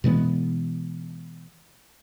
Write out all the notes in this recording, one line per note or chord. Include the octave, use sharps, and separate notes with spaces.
B2 E3 G#3 B3